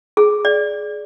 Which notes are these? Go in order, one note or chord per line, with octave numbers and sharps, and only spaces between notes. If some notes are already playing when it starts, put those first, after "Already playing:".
G#4
D5